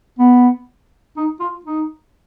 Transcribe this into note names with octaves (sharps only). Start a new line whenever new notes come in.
B3
D#4
F4
D#4